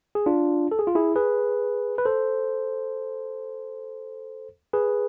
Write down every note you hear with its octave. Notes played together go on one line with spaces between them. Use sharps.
G#4
D4 F4
A4
G#4
F4
E4 G#4
G#4 B4
B4
A4 C5
G#4 B4